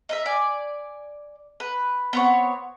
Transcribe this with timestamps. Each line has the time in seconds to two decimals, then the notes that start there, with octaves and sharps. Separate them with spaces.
0.09 D#4 D#5 E5
0.25 D5 G#5
1.60 B4
2.13 B3 C4 C#5